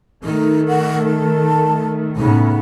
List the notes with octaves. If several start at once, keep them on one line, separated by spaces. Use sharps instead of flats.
D#3 A3 D#4
F#5
A5
A2 C#3 B3 D#4